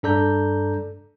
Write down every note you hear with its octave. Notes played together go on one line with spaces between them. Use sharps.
G2 D4 A4 D5 A#5 G6